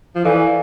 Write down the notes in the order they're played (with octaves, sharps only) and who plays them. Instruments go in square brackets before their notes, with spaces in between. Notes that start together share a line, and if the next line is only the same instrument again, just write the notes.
[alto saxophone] F3
[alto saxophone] E3 [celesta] A4 D5 F5 G#5